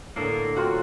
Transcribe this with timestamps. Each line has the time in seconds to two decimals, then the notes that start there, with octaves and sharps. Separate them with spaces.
0.16 A2 D3 A#3 A4
0.56 F#3 C4 F4 F#4